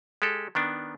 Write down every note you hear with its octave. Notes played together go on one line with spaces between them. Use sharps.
G#3 G4 A4
D#3 B3 D4